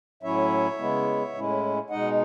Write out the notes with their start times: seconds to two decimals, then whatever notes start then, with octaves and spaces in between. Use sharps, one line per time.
0.23 A2 F#3 C#4 E4 C#5 E5
0.78 C#3 G#3 B3 E4
1.34 A2 G#3 C#4 E4
1.90 B2 G#3 D#4 D#5 F#5